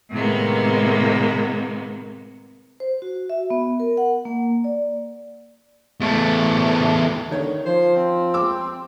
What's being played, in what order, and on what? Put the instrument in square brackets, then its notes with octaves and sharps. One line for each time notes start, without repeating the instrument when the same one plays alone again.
[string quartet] A2 C3 D#3 G#3 A#3 B3
[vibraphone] C5
F#4
E5
B3
A#4
F#5
A#3
D5
[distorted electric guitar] E2 A3
[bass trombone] D3 [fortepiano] D#3 C#5
[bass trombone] F3 [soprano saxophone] C5
[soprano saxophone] C4
[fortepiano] D6 E6